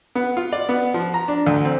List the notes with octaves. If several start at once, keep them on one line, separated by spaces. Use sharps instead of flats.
B3
F4
D5
B3
F3
A#5
D4
D2
C4